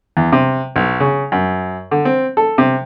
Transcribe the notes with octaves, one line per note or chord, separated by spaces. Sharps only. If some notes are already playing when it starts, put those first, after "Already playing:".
E2
C3
B1
C#3
F#2
D3
C4
A4
C3